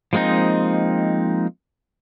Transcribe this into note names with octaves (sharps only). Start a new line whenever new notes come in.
F3 G#3 A#3 C4 D#4